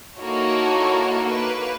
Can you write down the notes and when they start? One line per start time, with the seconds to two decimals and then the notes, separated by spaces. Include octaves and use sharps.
0.17 A#3 D#4 E4 F#4 A4 C#5
1.26 A#3 B4